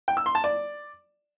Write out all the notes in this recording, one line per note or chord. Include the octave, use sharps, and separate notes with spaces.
G5
E6
C6
A5
D5